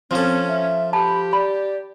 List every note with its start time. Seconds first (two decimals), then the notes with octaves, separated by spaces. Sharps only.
0.11 F3 C4 C#4 A4
0.48 E5
0.93 G4 A5 B5
1.33 D5 B5